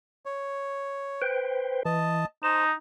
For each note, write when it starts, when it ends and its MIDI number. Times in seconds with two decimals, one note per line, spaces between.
0.26 1.22 73
1.22 1.83 71
1.22 1.83 72
1.22 1.83 79
1.85 2.25 52
1.85 2.26 75
1.85 2.26 81
2.43 2.74 63
2.43 2.65 72
2.43 2.72 81